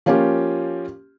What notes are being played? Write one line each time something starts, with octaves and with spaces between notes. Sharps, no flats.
F3 A#3 C#4 F4 G4